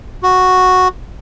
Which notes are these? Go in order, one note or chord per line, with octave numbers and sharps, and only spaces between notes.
F#4